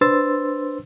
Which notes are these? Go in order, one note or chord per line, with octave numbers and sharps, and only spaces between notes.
D4 B4 C5 C6 E6 A6